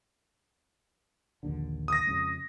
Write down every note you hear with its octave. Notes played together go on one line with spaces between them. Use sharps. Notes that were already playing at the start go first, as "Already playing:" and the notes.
A#1 D#2 D3
D#6 A#6
F2 C#3 G#3